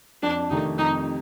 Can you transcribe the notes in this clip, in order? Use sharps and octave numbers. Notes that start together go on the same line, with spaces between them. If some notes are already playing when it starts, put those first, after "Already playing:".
F2 D4
C3 D#3 A3 D#4
F2 D#4